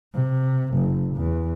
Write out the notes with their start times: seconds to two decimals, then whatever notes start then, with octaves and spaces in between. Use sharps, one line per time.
0.14 C3
0.74 F#1
1.15 E2